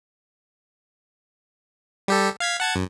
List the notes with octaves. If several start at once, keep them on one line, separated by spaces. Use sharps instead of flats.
G3 G4 A4
F5 G#6 B6
F#5 A5 G#6
F#2